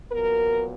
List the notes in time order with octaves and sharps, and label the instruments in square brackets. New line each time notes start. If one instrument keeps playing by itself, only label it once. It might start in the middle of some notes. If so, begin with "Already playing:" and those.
[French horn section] A#2 F#3 B3 A#4